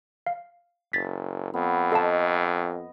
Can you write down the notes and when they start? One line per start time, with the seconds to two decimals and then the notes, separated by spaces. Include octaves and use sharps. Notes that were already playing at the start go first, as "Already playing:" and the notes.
0.27 F5
0.93 F#1 A6 B6
1.54 F2 B3
1.92 A4 D#5 F5 A5